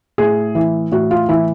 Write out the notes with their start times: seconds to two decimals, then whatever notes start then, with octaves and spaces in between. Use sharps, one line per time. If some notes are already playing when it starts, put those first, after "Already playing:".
0.18 A2 G#4
0.55 E3
0.92 A2 F#4
1.11 F4
1.29 E3 E4